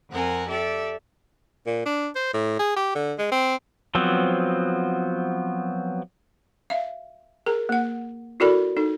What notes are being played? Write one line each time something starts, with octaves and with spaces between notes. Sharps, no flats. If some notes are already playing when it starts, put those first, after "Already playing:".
F2 C4 A#4 F#5 G#5
G4 A4 D5 E5
A#2
D4
C5
A2
G#4
G4
D3
G#3
C4
F3 F#3 B3 C4
E5 F5
G#4 A#4 A#5
A#3 F#5
E4 F#4 A4 A#4 D5 B5
D#4 A4